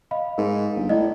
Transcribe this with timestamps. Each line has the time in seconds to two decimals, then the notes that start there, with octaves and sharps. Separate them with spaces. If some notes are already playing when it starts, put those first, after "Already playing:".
0.11 D#5 F5 B5
0.38 G#2 A#4 F5
0.76 G1
0.89 A2 E4 D5 D#5